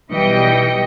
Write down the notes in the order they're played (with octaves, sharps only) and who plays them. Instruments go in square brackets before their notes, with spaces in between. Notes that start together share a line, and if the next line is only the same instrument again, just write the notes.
[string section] B1 E3 G3 D#5 G5 C#7